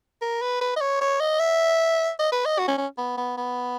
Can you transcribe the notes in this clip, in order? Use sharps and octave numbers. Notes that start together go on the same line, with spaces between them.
A#4
B4
B4
D#5
C#5
C#5
D#5
E5
D#5
B4
D#5
F#4
C#4
C#4
B3
B3
B3